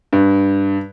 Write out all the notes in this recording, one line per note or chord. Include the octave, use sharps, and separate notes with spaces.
G2